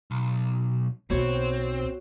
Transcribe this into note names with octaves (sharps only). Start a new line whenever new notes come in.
B1
B1 B2 B3 C4 F#4 C#5